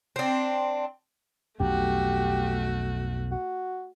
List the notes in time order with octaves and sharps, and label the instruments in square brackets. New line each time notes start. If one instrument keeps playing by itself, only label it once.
[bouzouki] C4 D4
[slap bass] B1 F2 [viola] A3 F#4 [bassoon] G4
[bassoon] F#4